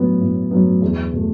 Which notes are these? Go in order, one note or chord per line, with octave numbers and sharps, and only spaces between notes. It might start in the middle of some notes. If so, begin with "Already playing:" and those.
Already playing: A2 F#3 B3
A2
F#3 B3
E2
B2 A3